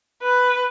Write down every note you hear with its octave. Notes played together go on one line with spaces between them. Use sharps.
B4